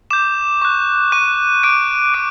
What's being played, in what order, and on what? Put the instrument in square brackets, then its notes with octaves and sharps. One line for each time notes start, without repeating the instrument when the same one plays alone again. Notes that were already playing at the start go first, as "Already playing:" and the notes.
[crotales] D6 G6 E7
C#6 F#6
C#6 F#6 D#7
D6 F#6 D7
D6 D7